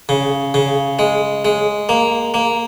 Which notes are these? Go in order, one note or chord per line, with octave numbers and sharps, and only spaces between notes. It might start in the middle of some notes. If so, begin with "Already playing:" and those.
C#3
C#3
G#3
G#3
A#3
A#3